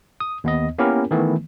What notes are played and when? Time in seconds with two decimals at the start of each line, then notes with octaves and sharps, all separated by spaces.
0.20 D#6
0.44 D#2 B3 D#5
0.79 A#3 B3 C#4 E4 G4 A#4
1.11 D#3 E3 A3 B3